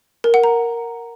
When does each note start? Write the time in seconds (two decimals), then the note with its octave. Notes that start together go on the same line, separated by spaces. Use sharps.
0.24 A#4
0.34 F#5
0.44 A#5